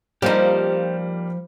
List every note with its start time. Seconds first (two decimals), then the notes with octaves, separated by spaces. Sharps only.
0.22 F3 G3 A#3 D#4 G4 C5